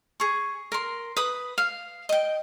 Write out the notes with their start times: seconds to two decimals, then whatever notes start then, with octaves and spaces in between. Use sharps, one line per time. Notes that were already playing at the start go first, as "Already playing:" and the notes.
0.20 G#4 C#6
0.72 A#4 C6
1.17 B4 B5 D#6
1.58 F5
2.09 D#5 G5